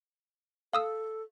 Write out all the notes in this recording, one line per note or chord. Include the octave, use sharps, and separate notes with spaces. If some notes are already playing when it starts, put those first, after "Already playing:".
A4 F5 D#6 E6